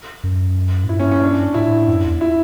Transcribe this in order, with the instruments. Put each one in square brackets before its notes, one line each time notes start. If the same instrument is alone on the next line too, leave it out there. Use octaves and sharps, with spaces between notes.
[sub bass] F#2
A2
[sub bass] G2 [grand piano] E4
[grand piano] C#4
C#4
D4
[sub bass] A2 [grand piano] E4
[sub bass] F#2
E2
[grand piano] E4